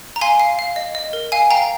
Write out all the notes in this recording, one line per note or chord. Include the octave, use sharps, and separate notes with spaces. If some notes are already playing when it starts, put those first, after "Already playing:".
A#5
F5 G#5 C6
F5
F5
D#5
D#5
A#4
F5 G#5
F5 G5 A#5